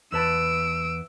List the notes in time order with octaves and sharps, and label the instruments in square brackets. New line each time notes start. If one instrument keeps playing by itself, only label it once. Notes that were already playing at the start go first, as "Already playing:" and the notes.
[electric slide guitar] E2 B4 A5 [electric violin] E6 D7